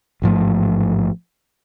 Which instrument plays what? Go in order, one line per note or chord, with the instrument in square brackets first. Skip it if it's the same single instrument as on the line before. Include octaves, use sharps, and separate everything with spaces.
[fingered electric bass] A1 G#2 F3 A3